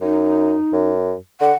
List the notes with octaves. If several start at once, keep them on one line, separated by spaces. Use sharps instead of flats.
F#2 D#4
F#2
D3 F#5